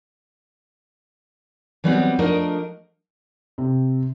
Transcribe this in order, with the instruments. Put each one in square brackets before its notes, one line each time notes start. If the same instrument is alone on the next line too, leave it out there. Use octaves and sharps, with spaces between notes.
[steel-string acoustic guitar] E3 F#3 G3 B3 C4
F3 A3 D4 A#4 D#5
[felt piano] C3